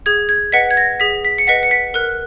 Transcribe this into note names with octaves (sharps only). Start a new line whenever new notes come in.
G#4 G#6
G#6
B4 D#5 F#5 B6
G#6
A#6
G#4 B6
B6
C#7
B4 D#5 F#5 B6
C#7
B6
A#4 F#6